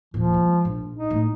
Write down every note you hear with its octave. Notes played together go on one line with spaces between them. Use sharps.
D#1 A#2 F3
G#3
A#1
D#4
A2